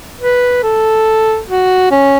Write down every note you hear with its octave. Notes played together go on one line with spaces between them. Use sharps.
B4
A4
F#4
C#4